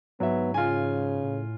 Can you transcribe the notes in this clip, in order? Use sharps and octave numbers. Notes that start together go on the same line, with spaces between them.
G#2 F#3 B3 E5
C#3 F4 G#5
A2